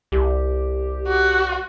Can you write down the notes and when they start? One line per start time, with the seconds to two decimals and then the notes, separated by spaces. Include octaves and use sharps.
0.12 C2 G4
1.07 F#4